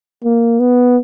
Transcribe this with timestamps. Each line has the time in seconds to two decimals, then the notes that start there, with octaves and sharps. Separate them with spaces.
0.24 A#3
0.60 B3